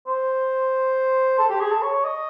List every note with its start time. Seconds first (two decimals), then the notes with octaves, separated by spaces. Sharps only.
0.07 C5
1.38 A4
1.50 G4
1.61 G#4
1.72 A4
1.82 C#5
2.04 D#5